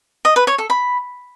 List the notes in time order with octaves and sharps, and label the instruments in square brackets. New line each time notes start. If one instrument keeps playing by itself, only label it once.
[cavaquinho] D#5
B4
C#5
A4
B5